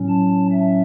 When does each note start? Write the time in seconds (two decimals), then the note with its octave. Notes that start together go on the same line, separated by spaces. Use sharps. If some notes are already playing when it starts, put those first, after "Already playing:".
Already playing: A2 F#3 C#4
0.09 A5
0.51 E5